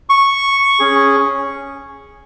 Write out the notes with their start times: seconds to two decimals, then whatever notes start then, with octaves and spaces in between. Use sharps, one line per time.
0.09 C#6
0.80 C#4 G#4